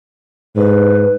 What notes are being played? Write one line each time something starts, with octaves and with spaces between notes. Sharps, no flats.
G#2 B4